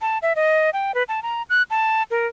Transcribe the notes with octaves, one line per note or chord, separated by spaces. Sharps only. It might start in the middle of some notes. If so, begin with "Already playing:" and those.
A5
E5
D#5
G5
B4
A5
A#5
F#6
A5
A#4